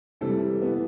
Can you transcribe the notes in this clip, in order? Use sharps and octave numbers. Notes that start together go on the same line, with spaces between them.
C3 E3 G3 A4
E3 B3